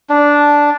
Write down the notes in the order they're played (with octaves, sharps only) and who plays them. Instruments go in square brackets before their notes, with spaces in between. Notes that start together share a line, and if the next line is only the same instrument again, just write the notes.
[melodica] D4